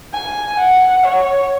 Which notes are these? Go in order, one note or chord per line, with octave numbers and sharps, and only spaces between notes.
G#5
F#5
C#5